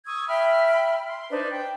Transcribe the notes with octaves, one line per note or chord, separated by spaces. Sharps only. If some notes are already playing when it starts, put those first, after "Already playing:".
C#6 D#6 E6 G#6
E5 G5 B5 F6
C6
D4 D#4 B4 C5
G5